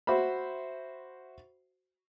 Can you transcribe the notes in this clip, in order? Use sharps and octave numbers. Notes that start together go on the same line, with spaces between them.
F#4 C5 E5 B5